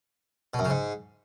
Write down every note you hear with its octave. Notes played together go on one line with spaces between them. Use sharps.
B2
F#2
C#3
G#2